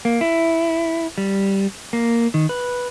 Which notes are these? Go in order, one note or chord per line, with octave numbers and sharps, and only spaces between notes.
A#3
E4
G3
A#3
D#3
B4